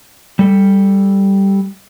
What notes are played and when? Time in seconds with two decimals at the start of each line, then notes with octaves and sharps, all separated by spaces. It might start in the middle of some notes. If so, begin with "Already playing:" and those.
0.39 G3 A4